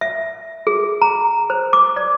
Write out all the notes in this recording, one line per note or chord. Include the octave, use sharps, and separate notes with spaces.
E5
G#4
A#5
C5
D6
D5